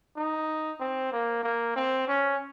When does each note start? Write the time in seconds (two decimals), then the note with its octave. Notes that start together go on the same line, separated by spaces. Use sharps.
0.16 D#4
0.80 C4
1.12 A#3
1.43 A#3
1.76 C4
2.08 C#4